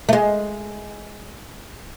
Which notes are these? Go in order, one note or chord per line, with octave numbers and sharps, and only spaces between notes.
A3
G#3